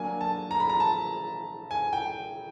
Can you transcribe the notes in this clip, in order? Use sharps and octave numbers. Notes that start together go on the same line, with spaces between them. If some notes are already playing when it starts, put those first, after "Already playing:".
Already playing: F#3 A#3 D4 G#5
A5
A#5
B5
A#5
A5
G#5
G5